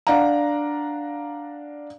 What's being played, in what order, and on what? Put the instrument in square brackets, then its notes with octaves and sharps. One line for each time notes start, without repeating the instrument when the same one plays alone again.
[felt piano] D4 D5 F5 F#5 A#5